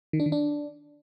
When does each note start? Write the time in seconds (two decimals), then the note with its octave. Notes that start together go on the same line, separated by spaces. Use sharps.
0.13 D#3
0.20 D4
0.26 D#3
0.32 D4